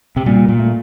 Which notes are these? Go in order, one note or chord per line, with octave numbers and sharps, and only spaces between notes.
C3
A#2 G3
A#2
A3